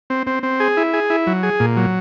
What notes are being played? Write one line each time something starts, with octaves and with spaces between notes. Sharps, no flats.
C4
C4
C4
G#4
E4
G#4
E4
F#3
G#4
A#2
F#3